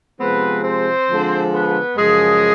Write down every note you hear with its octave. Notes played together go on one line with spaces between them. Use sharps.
C3 F3 G#3 B3 C4 B4
C4 C5
D3 F3 G#3
B3 B4
F#2 C#3 F3 G#3 G#4